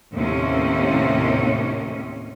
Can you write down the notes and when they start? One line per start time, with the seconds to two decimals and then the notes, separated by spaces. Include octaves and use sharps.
0.13 D#2 A2 C3 C#4